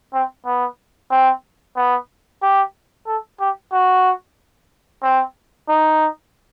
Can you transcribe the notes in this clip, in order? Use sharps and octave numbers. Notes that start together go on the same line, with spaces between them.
C4
B3
C4
B3
G4
A4
G4
F#4
C4
D#4